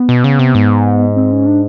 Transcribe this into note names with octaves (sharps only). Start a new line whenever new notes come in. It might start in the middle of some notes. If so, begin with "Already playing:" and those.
Already playing: B3
B2
C#3
C3
G#2
C4
C#4
D4